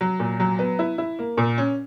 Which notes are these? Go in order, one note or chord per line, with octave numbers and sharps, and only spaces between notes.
F#3
A#2
F#3
B3
E4
E4
A#3
A#2
C#4